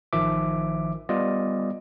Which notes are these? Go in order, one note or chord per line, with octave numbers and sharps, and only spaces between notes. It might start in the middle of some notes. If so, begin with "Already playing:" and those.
A1 D#3 F3 E5 D6
G3 B3 F4 D5 D#5